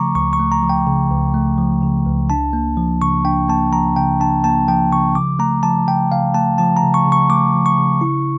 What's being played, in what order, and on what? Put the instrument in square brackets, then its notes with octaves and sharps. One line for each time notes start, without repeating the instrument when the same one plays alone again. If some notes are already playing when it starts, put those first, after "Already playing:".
Already playing: [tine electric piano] C#3 F3 A3 A#5 C#6 D6
C#2 C#6
C#6
A3
A#5
F3
G5
C#3
C#2
A3
F3
C#3
C#2
D4 A5
A#3
F3
C#3 C#6
D4 G5
A#3 A5
F3 A#5
C#3 G5
D4 A5
A#3 A5
F3 G5
C#3 C#6
C#3 D6
A3 A#5
F3 A5
C#3 G5
C#3 F5
A3 A5
F3 A5
A#5
C#3
C#6
C#3
C#6
A3 D6
F3
C#6
C#3
E4